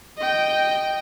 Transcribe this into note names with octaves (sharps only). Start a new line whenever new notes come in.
D#5 G5